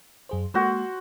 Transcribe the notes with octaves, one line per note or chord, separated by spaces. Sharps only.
F#2 G#4 C5
G#3 A#3 F#4 A4 C5